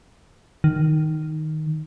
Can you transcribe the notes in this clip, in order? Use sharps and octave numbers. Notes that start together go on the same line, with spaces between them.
D#3